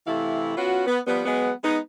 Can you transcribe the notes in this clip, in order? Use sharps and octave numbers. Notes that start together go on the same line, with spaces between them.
C3 E3 A3 E4 F5
B3 C#4 F4 F#4
B3
F3 G3 B3
F#3 G#3 B3
G#3 B3 D#4